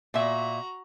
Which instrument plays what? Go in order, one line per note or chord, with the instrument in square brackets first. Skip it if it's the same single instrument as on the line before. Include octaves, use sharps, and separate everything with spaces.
[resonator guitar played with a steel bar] A#2 E5 [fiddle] F#4 A#5